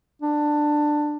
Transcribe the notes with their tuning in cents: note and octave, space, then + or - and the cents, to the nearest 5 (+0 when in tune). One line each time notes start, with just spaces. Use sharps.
D4 +15